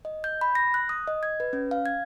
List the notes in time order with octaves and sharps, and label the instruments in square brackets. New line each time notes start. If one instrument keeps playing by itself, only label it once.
[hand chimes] D#5
G6
B5
A#6
F#6
D#6
D#5
G#6
B4
C#4
F5
G#6